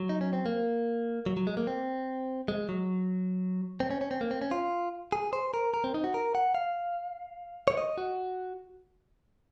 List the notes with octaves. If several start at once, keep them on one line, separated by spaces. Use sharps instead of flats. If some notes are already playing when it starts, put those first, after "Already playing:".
Already playing: F#3
D#4
C#4
C4
A#3
F#3
F#3
G#3
A#3
C4
G#3
F#3
C4
C#4
C#4
C4
A#3
C4
C#4
F4
G#4
C5
A#4
A#4
C4
D#4
F#4
A#4
F#5
F5
C#5
D#5
F#4